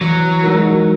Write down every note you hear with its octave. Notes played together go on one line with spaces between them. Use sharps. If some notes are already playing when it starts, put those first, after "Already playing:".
E3 F#3
G#3 D#4 F#4 A#4